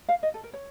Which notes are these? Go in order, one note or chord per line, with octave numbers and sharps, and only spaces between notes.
F5
D#5
A4
A#4
C#5